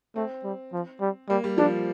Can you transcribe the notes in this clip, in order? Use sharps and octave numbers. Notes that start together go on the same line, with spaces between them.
A3 C4
G3
F3
G3
G3 A#3
G3
F3 D4